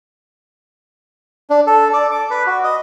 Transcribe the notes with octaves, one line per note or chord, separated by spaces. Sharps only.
D4
A4
D5
D6
B4
F#4
D#5